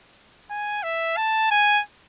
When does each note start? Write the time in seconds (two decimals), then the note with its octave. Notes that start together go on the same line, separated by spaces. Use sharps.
0.51 G#5
0.83 E5
1.17 A5
1.51 G#5